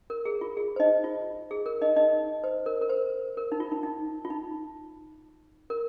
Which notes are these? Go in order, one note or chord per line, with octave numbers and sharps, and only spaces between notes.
A#4
G#4
F4
G#4
C5
D#4 D#5
F4
G#4
A#4
D#4 D#5
D#4 D#5
C5
A#4
A#4
C5
A#4
D#4
F4
D#4
D#4
F4
D#4
A#4